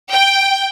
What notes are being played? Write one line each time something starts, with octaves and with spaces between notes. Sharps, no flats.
G5